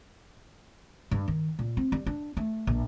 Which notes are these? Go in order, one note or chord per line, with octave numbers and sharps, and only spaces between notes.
G2
D#3
A#2
C4
G3
D4
A3
A#1